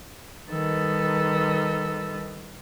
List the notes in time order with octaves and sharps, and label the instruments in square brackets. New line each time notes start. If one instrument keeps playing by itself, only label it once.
[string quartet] D#3 G3 A4 B4 D#5 E6